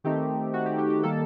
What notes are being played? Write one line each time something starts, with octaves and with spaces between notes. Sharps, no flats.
D#3 A3 C4 D#4 G4
F#4
G4
G4
G4
D#3 G3 A#3 A4